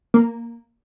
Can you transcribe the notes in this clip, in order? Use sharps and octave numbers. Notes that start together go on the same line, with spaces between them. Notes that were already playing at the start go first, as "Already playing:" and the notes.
A#3